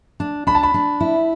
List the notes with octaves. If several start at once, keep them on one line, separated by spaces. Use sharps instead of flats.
D4
D4 B5
A5
B5
D4
E4